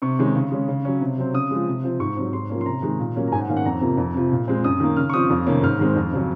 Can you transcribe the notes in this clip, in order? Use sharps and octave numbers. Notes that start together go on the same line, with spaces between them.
C3 C#6
D#3 G#3 C#4
C#3
G#3 C#4
C#3
F#3 C#4
C3
F#3 C4
C#3 D#6
F3 G#3
C3
F3 C4
G#2 C#6
F#3 C4
G#2 C6
F3 A#3 C#4
C6
C3 A#5
D#3 G#3
A#2
F#3 A#3 C#4
A#5
G#2 G#5
F#5
D#3 A#3 C#4 F5
F#5
F2 A#5
C3 F3 A#3
F2
C3 F3
A#2
G#3 C4
F#2 D#6
D#3 A#3
C#3 F6
C#6
F3 C4 D#6
F2
C3 D#3 A#3 C#4
G#2 F6
D#3 G#3 C4
F2
C#3 F#3 C#4